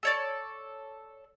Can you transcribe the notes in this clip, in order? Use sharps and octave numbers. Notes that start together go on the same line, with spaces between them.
A4 C#5 D5